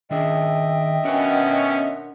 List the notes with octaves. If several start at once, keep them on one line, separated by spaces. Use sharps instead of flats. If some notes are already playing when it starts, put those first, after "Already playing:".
D#3 D4 G#4 D#5 E5 G5
B2 C#4 D4 A#4 F#5